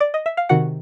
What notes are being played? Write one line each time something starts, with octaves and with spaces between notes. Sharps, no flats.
D5
D#5
E5
F5
C3 D#3 F#4 F#5